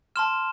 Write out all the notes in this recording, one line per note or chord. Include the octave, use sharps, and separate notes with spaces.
A5 C6 F6 E7